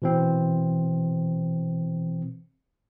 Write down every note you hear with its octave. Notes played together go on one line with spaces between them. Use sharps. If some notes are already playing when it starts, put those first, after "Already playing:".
B2 E3 C4